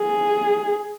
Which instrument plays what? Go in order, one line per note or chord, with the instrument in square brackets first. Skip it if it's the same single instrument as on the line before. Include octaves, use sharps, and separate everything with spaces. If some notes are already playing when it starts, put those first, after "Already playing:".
Already playing: [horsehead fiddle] G#4